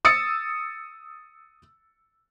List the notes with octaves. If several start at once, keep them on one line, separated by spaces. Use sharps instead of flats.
D#6 E6 A6 C#7